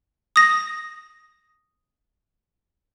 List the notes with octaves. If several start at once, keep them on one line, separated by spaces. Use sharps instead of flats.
D#6 A#6